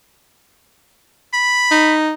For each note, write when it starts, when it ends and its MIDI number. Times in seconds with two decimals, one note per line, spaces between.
1.34 1.94 83
1.71 2.12 63